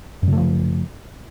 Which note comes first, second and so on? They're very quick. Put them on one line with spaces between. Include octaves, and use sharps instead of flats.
F#2 C#3 A3 F3